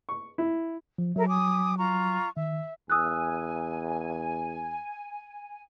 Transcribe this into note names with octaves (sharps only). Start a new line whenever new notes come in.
C#6
E4
F3
F#3 A4 A#4 E5
G#5 D6 D#6
F4 A#5 C#6
D#3 E5
E2 G#5 D#6 E6 F#6